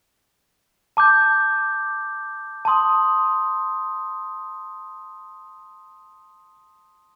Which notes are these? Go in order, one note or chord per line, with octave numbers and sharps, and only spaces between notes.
A5 D6 G6
A5 C6 D#6